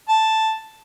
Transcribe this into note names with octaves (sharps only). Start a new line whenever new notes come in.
A5